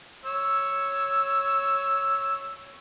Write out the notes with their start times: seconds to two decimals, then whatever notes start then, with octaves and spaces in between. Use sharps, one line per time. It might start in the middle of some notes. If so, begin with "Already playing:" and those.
0.26 C#5 E6